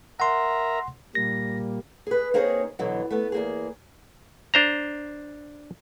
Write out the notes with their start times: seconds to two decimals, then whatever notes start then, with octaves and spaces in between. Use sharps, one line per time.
0.20 A#4 E5 F#5 A#5 C6
1.15 A#2 G3 A#3 A#6
2.07 G#4 B4
2.34 A#3 C4 D#4 G#4 C#5
2.79 B2 D3 E3 F#3
3.11 A3 B3
3.32 E2 A#3 G#4
4.54 D4 C5 A#5